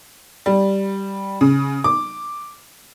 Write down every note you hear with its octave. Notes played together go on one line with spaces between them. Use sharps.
G3
C#3
D6